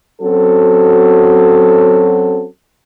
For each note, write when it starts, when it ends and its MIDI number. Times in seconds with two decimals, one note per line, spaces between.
0.21 2.45 54
0.21 2.45 60
0.21 2.45 61
0.21 2.45 66
0.21 2.45 69